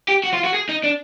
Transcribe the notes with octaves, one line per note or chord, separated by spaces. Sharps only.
G4
F#4
F4
F#4
G#4
D#4
D4